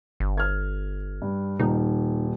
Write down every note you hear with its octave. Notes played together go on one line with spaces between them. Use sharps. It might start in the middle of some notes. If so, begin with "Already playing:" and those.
G1
F6 G#6
G2
D#1 D#4